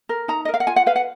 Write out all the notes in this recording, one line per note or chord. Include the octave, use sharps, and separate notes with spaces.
A#4
D#4 A#5
D#5
A#4
F5
F#5
F4 G#5
F#5
B4 F5
F#5